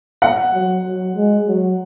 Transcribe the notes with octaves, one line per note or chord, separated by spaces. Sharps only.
F#5
F#3
F#3
G#3
F#3